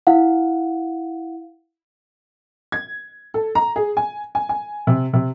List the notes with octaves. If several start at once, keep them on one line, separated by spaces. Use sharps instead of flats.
E4 F5 F#5
G#6
A4
A#5
G#4
G#5
G#5
G#5
C3
C3